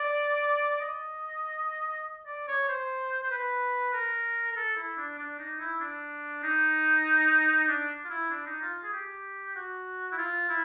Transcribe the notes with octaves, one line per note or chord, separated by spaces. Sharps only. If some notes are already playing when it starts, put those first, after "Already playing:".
Already playing: D5
D#5
D5
C#5
C5
C5
B4
A#4
A#4
A4
E4
D4
D4
D#4
E4
D4
D#4
D4
F4
E4
D4
D#4
F4
G#4
G4
F#4
E4
F4
E4